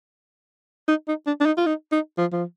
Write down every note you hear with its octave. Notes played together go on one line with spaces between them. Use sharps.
D#4
D#4
D4
D4
D#4
F4
D#4
D#4
F3
F3